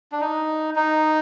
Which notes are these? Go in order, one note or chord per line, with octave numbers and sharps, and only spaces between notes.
D4
D#4
D#4